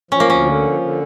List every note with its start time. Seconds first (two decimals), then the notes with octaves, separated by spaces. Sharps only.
0.11 F3 C#4
0.20 A#3
0.28 D2 C#4
0.45 D3
0.62 F3
0.80 D3